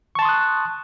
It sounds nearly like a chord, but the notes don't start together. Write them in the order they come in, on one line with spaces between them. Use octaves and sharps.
C#6 A5 C6 D#6 F#6